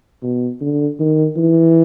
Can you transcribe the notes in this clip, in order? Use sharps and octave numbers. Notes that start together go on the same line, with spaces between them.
B2
D3
D#3
E3